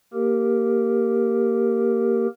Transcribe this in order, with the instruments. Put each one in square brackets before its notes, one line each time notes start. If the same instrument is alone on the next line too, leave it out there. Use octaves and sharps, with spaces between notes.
[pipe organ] A#3 G4 A#4